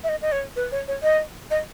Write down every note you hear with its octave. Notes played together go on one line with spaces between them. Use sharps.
E5
D#5
D#5
C#5
B4
C#5
C#5
D#5
D#5